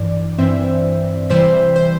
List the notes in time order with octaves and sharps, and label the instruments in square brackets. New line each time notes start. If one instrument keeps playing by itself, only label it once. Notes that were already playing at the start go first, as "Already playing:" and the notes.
Already playing: [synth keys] G2 E3 D5
G2 E3 C4 C5 E5
C3 E3 G3 C5 E5
C5